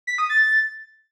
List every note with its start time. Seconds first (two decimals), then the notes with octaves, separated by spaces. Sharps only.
0.07 B6
0.18 D#6
0.30 A6